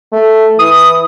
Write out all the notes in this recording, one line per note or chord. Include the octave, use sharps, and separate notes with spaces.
A3
E3 D#6